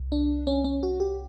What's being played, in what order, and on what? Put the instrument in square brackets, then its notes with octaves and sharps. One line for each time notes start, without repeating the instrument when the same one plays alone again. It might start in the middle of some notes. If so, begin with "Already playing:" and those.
Already playing: [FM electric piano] C2
D4
C#4
C#4
F#4
G4